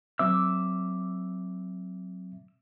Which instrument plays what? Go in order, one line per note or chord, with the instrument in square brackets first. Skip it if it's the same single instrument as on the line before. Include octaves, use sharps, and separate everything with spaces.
[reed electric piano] F#3 C4 E5 [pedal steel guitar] D6 E6